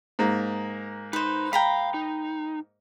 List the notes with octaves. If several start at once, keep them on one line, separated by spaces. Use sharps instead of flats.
G#2 A#3
D#4 B4 C5
F5 G5 A#5 B5
D#4